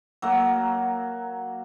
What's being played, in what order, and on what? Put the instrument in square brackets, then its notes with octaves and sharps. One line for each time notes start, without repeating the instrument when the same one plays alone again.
[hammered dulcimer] F#3 A#3